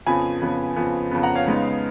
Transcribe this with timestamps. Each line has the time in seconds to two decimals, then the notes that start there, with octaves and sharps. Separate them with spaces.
0.06 F2 C#3 F3 B3 G#5 B5
0.42 F2 C#3 F3 B3
0.76 F2 C#3 F3 B3
1.11 F2 C#3 F3 B3
1.23 F#5 A#5
1.35 C#5 F5
1.47 C#3 G#3 B3 D#4